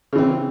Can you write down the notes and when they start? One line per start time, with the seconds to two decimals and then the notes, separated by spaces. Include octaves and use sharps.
0.13 C#3
0.15 E3
0.18 C4